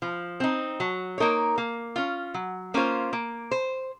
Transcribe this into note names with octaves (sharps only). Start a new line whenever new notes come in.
F3
C4 D#4
F#3
A#3 D#4 A#4 C#5
A#3
C#4 F4
F#3
A#3 C#4 F4 C5
A#3
C5